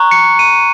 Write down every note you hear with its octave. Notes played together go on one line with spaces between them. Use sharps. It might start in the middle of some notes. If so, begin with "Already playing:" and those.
Already playing: A#5 C#6 F#6
C#7
D#7